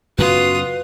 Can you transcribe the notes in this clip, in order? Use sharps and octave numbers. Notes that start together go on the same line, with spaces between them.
F#2 C#3 B3 F4 F#4 B4 D#6